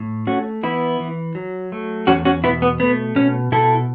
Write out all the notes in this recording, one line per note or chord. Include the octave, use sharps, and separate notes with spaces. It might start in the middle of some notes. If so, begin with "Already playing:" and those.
Already playing: A2
A3 C#4 F#4
E3 B3 E4
E3
F#3
A3
E2 C#4 F#4
C#4 F#4
B2 B3 E4
B3
A3 B3
B2 C#4
B2 E4 A4